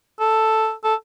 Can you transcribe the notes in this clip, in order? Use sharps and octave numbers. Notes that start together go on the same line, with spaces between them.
A4
A4